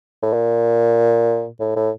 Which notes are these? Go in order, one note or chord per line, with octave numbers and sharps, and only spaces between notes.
A2
A#2
A2
A2